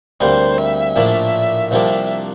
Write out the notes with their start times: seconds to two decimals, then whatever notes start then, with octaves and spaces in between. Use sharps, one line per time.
0.20 D2 C3 G3 A#3 C5
0.58 E5
0.96 A#1 A2 F3 A#3 D4
1.71 C2 C3 F3 A#3 D4 E5